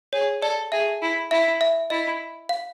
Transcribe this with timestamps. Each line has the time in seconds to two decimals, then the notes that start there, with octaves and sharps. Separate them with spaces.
0.13 G#4 C#5
0.42 A4 D5
0.72 G#4 E5
1.02 E4
1.31 E4 E5
1.61 E5
1.90 E4 D#5
2.49 F5